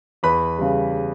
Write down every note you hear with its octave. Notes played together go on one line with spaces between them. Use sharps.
E2 B4 B5
C#3 G3